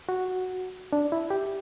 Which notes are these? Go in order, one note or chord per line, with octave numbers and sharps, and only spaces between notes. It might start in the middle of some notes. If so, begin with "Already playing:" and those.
F#4
D4
E4
G4